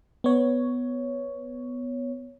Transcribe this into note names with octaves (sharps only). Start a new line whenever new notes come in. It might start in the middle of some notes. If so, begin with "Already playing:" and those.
B3 C#5